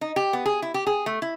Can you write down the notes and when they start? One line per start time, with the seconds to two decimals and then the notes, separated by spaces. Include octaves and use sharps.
0.01 D#4
0.16 G4
0.33 B3
0.46 G#4
0.62 E4
0.74 G4
0.87 G#4
1.06 A3
1.22 E4